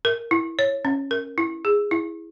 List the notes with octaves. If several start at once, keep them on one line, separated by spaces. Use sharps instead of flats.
A#4
E4
C#5
C#4
A#4
E4
G#4
E4